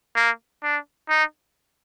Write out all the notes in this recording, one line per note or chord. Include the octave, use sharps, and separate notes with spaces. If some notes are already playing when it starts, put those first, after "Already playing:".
A#3
D4
D#4